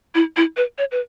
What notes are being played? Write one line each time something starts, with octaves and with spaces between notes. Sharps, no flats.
E4
E4
B4
C#5
B4